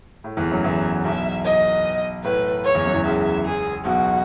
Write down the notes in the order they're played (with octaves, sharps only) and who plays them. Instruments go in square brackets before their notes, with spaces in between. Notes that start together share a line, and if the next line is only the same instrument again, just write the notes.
[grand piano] A2
E2 E3
F#2 F#3
[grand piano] E2 E3 [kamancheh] E5
[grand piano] B1 B2 [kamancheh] E5
[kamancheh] D#5
[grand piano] A2 [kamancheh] B4
[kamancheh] C#5
[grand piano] E2 E3
F#2 F#3
E2 E3
[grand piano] C#2 C#3 [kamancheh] E5
[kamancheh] G#4
[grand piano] B1 B2 [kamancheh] F#4